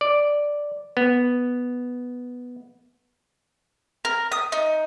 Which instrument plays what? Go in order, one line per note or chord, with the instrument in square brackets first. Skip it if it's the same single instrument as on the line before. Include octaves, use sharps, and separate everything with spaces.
[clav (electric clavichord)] D5
B3
[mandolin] A#4
D#6
D#4